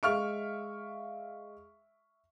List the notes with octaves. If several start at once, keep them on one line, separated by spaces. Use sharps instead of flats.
G#3 E5 F5 C#6 F6 D7